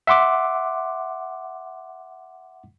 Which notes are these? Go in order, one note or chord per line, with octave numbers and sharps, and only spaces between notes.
E5 F#5 C6 D6